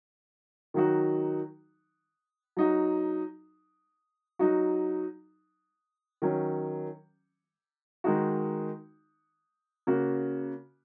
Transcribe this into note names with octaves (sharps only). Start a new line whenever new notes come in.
D#3 F#3 D#4 F#4
F#3 D#4 F#4
F#3 D#4 F#4
D#3 F#3 C#4
D#3 G#3 D#4 F#4
C#3 A#3 F#4